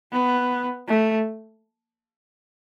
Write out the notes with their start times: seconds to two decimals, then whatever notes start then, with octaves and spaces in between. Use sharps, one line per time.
0.12 B3
0.88 A3